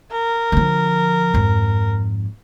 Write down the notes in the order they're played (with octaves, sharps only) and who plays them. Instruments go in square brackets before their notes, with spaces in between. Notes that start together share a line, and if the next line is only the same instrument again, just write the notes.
[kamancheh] A#4
[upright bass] D3 F3
F2 G#2